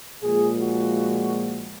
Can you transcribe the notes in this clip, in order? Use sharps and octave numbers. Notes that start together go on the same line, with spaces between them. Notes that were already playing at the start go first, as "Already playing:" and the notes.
A#2 F3 G#3 G#4
F#4